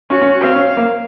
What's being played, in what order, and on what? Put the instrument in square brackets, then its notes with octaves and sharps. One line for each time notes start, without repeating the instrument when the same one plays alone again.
[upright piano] C#4 [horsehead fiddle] F#4
[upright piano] C#4
[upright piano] C4 [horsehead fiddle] F5
[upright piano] C#4
A#3